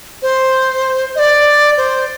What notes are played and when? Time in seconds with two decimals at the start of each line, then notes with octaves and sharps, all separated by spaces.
0.22 C5
1.15 D#5
1.19 D5
1.77 C5